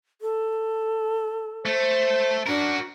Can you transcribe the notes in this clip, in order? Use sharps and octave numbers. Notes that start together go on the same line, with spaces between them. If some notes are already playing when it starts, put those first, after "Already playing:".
A4
A3 C5
D4 F#4 A#4